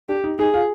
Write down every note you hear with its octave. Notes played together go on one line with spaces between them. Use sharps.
D4 G4
D#4
D#4 G#4
F4